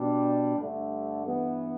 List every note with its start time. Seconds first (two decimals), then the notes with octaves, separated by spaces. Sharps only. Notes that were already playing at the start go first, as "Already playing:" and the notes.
Already playing: B2 G3 D4
0.57 G2 D3 A3
1.26 G2 E3 B3